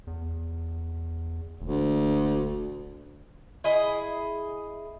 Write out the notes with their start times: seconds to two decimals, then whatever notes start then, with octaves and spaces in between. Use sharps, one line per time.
0.07 E2
1.61 E1 D2
3.64 E4 G#4 D#5